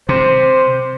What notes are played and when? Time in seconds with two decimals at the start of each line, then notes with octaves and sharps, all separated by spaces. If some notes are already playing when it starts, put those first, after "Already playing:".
0.09 C3 C5